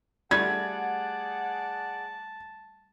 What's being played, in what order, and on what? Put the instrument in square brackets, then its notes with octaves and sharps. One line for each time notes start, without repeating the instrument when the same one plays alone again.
[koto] G3 A3 F4 [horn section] G#4 D5 F#5 [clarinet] A5 [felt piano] G#6